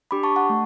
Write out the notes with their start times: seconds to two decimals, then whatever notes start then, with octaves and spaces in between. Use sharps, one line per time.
0.11 D4 G4 B5 D6
0.23 A5 C#6
0.36 F#5 A5
0.50 A3